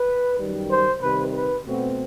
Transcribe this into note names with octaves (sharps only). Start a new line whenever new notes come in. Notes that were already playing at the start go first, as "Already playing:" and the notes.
Already playing: B4
F#2 D#3 G3
C5
C3 D#3 G3 B4
B4
B2 A3 C4 F#4